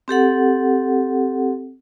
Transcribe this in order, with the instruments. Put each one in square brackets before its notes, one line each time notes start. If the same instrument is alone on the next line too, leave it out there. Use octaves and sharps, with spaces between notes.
[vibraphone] C4 G4 A4 F#5